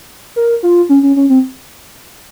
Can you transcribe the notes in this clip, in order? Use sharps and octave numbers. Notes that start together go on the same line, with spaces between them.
A#4
F4
C#4
C#4
C#4
C4